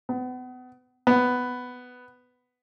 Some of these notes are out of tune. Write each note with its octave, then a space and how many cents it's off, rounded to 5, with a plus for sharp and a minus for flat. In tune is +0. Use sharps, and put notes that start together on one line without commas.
B3 +35
B3 +10